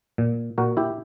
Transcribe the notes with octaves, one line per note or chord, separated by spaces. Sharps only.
A#2
A#2 F#4 A#4
E4 G4